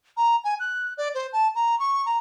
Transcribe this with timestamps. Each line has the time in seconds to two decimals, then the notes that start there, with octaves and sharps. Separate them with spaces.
0.17 A#5
0.44 G#5
0.60 F#6
0.97 D5
1.15 C5
1.33 A5
1.55 A#5
1.79 C#6
2.06 A#5